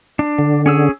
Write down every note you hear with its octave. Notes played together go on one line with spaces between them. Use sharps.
D4
D3
C#4 G#4 E6